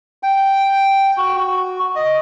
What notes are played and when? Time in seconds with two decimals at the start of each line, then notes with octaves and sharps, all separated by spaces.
0.23 G5
1.17 F#4
1.36 F#4
1.96 D#5